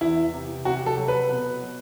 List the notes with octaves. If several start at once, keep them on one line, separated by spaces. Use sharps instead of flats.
E2 E4
C3
C3 F#4
A4
F#3
B4
B2
F#3